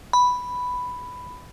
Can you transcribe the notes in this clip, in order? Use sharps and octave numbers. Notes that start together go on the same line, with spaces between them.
B5